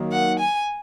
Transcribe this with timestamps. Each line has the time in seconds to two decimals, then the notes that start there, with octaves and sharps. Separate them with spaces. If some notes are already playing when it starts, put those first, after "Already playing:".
Already playing: D#3 F#3 A#3
0.12 F#5
0.40 G#5